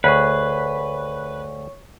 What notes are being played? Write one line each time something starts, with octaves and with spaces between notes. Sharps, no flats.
D2 G#4 B4 C#5 C#6